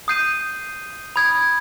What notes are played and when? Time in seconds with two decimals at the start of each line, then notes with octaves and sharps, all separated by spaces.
0.08 D#6 G6 C7 D#7
1.16 B5 D#6 G#6